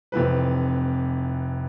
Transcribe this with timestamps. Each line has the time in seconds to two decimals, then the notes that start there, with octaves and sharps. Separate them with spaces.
0.12 F1 E3 C4 B4